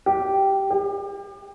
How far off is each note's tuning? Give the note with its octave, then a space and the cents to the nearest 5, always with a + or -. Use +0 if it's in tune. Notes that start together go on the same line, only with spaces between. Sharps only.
G4 -10
G4 +35